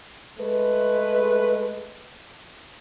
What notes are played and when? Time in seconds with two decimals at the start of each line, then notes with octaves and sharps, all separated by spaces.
0.39 G#3 A3 B4